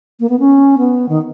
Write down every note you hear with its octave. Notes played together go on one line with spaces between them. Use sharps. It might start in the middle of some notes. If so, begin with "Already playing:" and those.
A#3
B3
C#4
B3
D#3